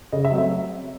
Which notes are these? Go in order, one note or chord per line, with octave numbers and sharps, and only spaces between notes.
C#3 D#5
E5
F#3 A3 C4
E5